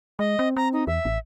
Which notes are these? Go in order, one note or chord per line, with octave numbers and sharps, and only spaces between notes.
G#3 D#5
C4
C4 A#5
D#4
E2 E5
A1